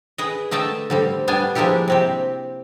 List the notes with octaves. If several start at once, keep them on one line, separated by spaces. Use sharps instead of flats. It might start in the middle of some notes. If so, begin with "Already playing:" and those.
G#4 B4 D#5
D3 A3 D#5 E5 G5 A5
D3 G3 C4
G3 B3 D4 G#5
F3 G#3 A#3 D4 E4 G4
C3 C4 G4